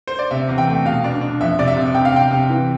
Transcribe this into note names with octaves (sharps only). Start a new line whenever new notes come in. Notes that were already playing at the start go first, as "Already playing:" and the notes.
C5
D5
C3 E5
E2
G5
A3
B2 F5
D4
D4
F2 E5
C3 D5
E5
C3
C3 G5
F5
C3 G5
C3
E3